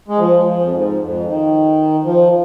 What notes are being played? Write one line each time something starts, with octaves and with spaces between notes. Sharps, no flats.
G#3
F3
F3
F2
G#2
F2
F3
D#3
F3